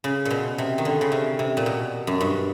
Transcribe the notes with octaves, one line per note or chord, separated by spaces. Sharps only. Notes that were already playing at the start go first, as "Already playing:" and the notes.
C#3
A#2
B2
C3
D#3
D3
C#3
C3
C3
A#2
B2
F#2
G2